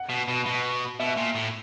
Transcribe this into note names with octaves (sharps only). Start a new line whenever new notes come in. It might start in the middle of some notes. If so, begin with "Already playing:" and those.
Already playing: F#5
B2
B2
B2
B2 E5
A#2
A2